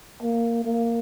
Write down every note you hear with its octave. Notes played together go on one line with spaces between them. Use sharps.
A#3
A#3